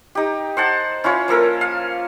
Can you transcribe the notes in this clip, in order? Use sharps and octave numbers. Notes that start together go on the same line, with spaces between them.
D#4 G4
C5 F#5 A5
C#4 E4 F4 C#5
F3 A#3 A4 A#4
F5